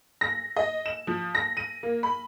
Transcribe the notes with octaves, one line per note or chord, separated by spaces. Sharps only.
A#6
D#5
E7
F3
A#6
D#7
A#3
B5